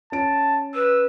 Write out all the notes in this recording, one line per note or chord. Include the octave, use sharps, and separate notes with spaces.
C#4 A5 D7
B4 E6